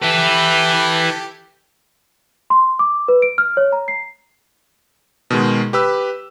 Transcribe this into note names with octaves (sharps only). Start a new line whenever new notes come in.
E4 G4 A4 B4
C6
D6
B4
D7
F6
C#5
A#5
C7
B2 D#3 G#3
G4 B4 E6